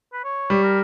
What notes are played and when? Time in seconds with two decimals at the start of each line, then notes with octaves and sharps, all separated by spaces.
0.13 B4
0.24 C#5
0.50 G3
0.63 A#4